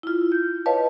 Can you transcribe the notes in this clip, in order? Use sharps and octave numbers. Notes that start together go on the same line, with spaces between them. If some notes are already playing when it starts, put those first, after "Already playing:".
E4 F4
G6
B4 C#5 D#5 F5 A5